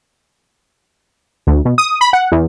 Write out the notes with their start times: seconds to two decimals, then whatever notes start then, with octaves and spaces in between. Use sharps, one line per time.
1.47 D2
1.65 B2
1.78 D#6
2.01 B5
2.13 F#5
2.32 E2